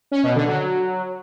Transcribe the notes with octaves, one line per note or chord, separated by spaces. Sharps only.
C#4
B2
D3
F#3